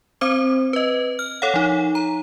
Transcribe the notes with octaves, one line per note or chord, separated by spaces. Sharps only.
C4 C5 D6
B4 D#5
F6
A4 C#5 F5 F#5
F3 D#4
A#5